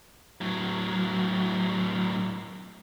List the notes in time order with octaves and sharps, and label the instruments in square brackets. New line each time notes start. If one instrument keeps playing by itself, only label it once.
[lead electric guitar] A2 F#3